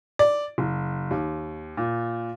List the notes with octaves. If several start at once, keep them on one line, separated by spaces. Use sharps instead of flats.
D5
F#1
D#2
A#2